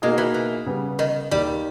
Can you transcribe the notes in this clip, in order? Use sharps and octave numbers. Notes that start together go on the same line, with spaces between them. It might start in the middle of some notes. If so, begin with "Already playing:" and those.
B2 G#3 A#3 D#4 G#4
E3
E3
C#3 G3 B3
D#3
D#2 D#3 G3 A#3